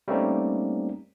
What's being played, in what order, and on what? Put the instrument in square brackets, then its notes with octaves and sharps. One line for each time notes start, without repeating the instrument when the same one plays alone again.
[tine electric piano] G3 A3 A#3 C4 C#4 D#4